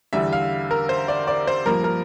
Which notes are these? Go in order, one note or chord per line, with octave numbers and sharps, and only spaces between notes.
E2 D3 G3 E5
F5
A#4
C5
D5
D5
C5
G2 F3 A#3 A#4
A#4